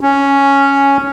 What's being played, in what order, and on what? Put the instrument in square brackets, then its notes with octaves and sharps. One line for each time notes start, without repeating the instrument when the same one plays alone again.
[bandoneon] C#4